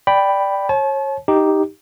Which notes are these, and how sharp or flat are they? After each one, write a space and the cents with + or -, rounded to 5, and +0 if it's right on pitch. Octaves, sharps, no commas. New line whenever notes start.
D5 +0 G5 +0 B5 +0
C#5 -30 A5 -40
D#4 +0 G4 +0